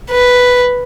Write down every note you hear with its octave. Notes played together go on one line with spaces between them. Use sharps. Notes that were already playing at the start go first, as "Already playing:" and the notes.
B4